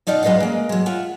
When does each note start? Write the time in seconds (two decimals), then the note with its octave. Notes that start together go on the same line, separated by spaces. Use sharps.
0.07 B2 D#4 D5 F5 F#5
0.23 F#3 G#3 B4 D#5 F5 F#5
0.40 G#3 A#3
0.69 F#3 G#3
0.86 F4 E5 F#5